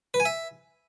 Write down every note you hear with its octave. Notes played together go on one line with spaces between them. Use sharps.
B4
G#5
E5